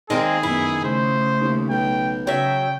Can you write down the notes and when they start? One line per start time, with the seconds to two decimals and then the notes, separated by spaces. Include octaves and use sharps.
0.10 D#3 G#3 A#3 C4 G#4
0.43 F#2 B3 E4
0.85 C#3 A3 C5
1.41 D#2
1.70 B1 G5
2.27 C#3 F#3 E5 G5